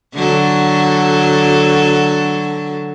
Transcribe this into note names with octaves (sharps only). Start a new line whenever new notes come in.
D3 F#3 A4